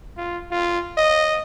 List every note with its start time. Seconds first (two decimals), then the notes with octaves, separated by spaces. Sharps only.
0.17 F4
0.51 F4
0.97 D#5